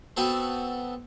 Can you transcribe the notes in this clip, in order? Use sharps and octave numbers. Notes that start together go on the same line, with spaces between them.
B3 C4 F#4 A4 C5